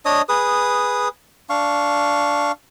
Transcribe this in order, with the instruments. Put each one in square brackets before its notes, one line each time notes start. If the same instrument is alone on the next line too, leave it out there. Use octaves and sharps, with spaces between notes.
[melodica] D4 C#5 D#5 D#6
G#4 B4 D#6
D4 F5 C#6